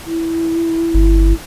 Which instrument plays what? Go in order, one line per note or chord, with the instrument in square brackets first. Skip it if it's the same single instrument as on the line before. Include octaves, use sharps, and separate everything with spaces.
[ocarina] E4
[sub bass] G1